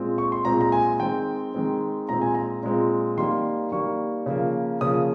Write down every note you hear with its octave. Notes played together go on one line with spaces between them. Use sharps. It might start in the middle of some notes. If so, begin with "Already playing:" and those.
Already playing: A#2 G#3 C4
C#6
C6
A#2 G#3 C4 A#5
A#5
G#5
D#3 G#3 C4 G5
D#3 G#3 C4
A#2 G#3 C4 A#5
G#5
A#5
A#2 G#3 C4
D#3 G3 A#3 C6
D#3 G3 A#3 C#6
C#3 F3 A#3
C#3 F3 A#3 D#6